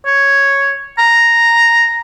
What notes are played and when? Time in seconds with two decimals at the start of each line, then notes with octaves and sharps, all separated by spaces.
0.06 C#5
0.99 A#5